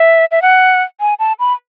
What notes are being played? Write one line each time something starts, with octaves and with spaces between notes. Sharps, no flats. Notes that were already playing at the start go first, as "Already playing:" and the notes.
Already playing: E5
E5
F#5
G#5
A5
B5